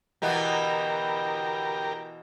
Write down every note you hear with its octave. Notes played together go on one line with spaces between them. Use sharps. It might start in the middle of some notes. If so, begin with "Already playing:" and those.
B2 E3 B3 G4 A#4